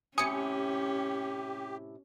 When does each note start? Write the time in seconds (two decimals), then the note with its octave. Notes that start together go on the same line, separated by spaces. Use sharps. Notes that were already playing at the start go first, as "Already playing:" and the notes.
0.18 A2 C3 C#4 G4 G#5 D#6 C#7